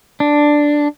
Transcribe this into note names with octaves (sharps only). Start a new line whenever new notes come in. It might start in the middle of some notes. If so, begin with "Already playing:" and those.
D4